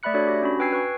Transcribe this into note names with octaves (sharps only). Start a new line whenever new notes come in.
A3 D5 E5 B5 F#6 C#7
D4 F#4 A4 C#5 D5
G4 A#6
C#4 D4 F#4 B5
B4 G5 G#5 E6 G#6 C7
B4 C#6